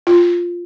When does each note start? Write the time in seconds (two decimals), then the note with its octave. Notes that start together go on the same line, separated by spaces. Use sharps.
0.07 F4